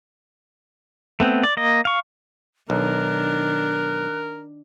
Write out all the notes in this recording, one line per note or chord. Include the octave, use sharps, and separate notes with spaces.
A3 B3 C4
D5
A#3 D#5
F5 C#6
B1 D#3 D4 A#4 F#6